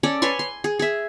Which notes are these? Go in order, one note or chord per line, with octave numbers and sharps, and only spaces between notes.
C#4 A4 D5
B4 C#5 G#5 C6
C6
G#4
G#4 E5